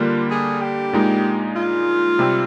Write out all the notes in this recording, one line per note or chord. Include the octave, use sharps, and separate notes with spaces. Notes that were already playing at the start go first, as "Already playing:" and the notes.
Already playing: D3 G3 A#3 D4 F4
G#4
G4
A#2 G#3 D#4
F4
C3 G3 C4